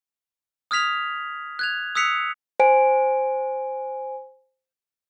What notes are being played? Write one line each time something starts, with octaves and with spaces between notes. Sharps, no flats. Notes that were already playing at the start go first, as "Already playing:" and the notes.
D#6 F6 G#6 B6 F7
F#6 G#6 F7
D#6 E6 F#6 B6 C#7 F7
C5 G#5 D7